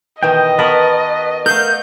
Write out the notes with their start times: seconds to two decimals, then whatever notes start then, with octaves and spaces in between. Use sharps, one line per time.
0.23 B2 D#3 E3 D#5 G5
0.59 B3 F#4 A#4 B4 A5 B5
1.46 A3 A#4 F5 F#5 G6